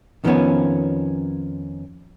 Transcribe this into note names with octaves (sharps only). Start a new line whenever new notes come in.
F2 D#3 F3 A#3 B3 C#4